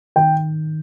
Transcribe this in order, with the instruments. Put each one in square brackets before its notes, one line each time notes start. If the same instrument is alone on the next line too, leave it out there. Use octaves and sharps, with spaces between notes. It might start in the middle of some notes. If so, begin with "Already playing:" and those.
[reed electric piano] D#3 [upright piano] G5